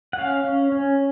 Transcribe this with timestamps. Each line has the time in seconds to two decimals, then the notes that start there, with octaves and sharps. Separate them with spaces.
0.13 F#5
0.18 C#4 F5
0.44 C#4
0.72 C#4